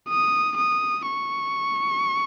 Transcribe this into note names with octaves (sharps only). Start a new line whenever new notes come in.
D#6
D#6
C#6